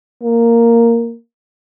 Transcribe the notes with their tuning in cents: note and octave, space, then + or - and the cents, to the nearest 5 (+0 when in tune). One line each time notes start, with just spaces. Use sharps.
A#3 -5